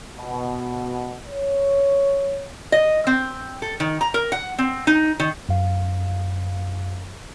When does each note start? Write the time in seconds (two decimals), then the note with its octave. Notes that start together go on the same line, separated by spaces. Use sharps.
0.16 B2
1.29 C#5
2.72 D#5
3.07 C4
3.62 A4
3.80 D#3
4.01 A#5
4.14 A#4
4.32 F#5
4.58 C4
4.87 D#4
5.20 D#3
5.49 F#2 F5